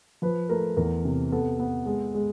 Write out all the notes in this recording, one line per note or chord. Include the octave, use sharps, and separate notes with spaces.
F3 B4
A3 A#4
E2 A#4
C3
B3 A4
B3
G#3
G#3